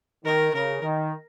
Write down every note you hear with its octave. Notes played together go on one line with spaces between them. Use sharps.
D#3 A#4
C#3 A#4
D#3